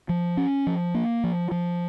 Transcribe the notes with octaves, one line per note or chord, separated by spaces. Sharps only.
F3
C#4
F3
A#3
F3
F3